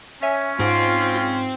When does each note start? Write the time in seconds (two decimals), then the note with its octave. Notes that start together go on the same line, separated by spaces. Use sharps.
0.22 C#4 C#5 E5 G#5
0.60 G#2 C4 F4